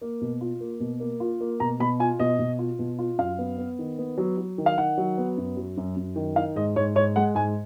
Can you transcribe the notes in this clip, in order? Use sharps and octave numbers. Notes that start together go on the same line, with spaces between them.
A#3
B2
F4
A#3
B2
A#3
F4
A#3
B2 A#5
B2 B5
F4 G#5
B2 D#5
B2
F4
B2
F4
F#2 F5
B3
B3
D#3
B3
F#3
F#3
D#3
F5
D#3 F#5
F#3
B3
F#2
F#3
F#2
F#2
D#3
D#4 F5
G#2 D#5
G#2 C#5
G#2 C#5
G#3 F#5
G#2 G#5